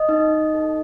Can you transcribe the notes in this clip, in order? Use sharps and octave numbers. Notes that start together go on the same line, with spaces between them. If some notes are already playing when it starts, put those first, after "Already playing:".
Already playing: D#5
D#4
A4